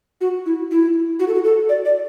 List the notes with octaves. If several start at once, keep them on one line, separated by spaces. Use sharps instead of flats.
F#4
E4
E4
F#4
A4
F#4
A4
D5
D5